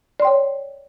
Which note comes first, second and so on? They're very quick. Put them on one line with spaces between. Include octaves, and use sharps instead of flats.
D5 C6 G5 C#5